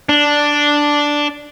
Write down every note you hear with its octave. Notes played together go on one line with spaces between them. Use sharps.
D4